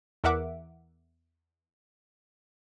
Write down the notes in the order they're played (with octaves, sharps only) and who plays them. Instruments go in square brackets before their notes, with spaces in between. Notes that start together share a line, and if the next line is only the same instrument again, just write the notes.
[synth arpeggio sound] E2 A#4 E5 F#5 D6